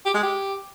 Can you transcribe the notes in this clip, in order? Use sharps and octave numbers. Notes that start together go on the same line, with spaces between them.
G4
G#3
G4